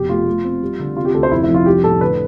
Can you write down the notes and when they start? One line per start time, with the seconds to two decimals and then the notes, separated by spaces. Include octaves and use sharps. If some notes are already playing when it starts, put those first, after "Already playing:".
Already playing: F1 B2 G4
0.09 A3 F4
0.26 A3
0.44 C4
0.62 G3
0.79 D3
0.97 C3 F4
1.05 G4
1.14 D2 A4
1.23 C5
1.31 F1 E4
1.43 E4
1.49 F2
1.54 F4
1.66 G3 G4
1.84 A2 A4
2.01 D3 B4